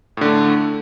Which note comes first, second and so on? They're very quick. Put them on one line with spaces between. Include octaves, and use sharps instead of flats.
A2 D3 A3